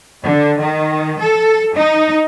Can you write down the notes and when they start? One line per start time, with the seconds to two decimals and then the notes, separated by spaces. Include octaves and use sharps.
0.23 D3
0.60 D#3
1.21 A4
1.76 D#4